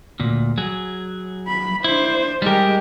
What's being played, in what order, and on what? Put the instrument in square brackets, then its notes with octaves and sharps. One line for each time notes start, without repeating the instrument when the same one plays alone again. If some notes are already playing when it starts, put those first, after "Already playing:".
[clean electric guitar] D2 A#2
F#3 G#4
[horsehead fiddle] B5
[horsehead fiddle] D4 C5 [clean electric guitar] E4
[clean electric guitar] G3 A#4 [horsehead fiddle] G#3 G4